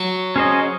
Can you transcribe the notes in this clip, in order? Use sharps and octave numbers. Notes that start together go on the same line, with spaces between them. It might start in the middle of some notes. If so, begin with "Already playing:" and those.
Already playing: F#3
C#4 G#4 C5 D#5